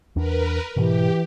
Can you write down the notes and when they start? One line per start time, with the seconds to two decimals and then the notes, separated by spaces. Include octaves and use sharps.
0.16 E2 D4 A#4 B4
0.76 G#2 B2 E3 G4